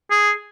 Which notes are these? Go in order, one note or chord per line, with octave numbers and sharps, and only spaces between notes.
G#4